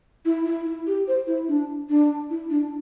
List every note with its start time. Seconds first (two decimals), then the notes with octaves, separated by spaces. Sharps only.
0.25 E4
0.45 E4
0.66 E4
0.87 G4
1.08 C5
1.27 E4
1.48 D4
1.89 D4
2.30 E4
2.50 D4